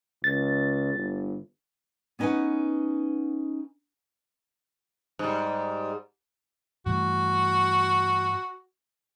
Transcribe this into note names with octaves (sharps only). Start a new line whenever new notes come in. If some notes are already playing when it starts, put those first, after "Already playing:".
C#2 A6
G1
B3 C#4 D#4 B4 F#5 G#5
G#2 G3
G2 E3 A3 F#4